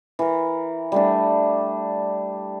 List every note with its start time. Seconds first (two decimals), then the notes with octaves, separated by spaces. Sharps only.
0.19 E3 A#4
0.92 G3 A3 D4